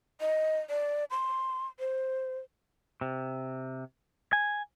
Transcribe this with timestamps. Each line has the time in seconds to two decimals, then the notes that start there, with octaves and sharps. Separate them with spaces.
0.21 D#5
0.70 D5
1.11 C6
1.79 C5
3.01 C3
4.33 G#5